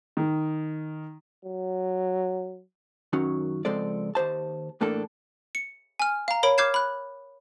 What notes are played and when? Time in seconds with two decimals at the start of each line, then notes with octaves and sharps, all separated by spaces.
0.17 D#3
1.45 F#3
3.13 F#2 D#3 F#3 C#4
3.65 C#2 F3 G#3 C4 A4 D5
4.15 D#2 G4 C5 A5
4.81 E2 A2 A#3 D4 A4
5.55 C#7
5.99 G#5 F6
6.28 F5 A#5
6.43 A#4 C#5 B5 D7
6.58 D6 F6 G6 G#6 C7 E7
6.74 B5 F#6